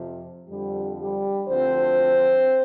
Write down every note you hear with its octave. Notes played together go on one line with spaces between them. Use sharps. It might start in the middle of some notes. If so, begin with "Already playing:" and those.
Already playing: F2 C3 F3
F2 D3 F3 G3 G4
G3 G4
D2 D3 F3 C4 C5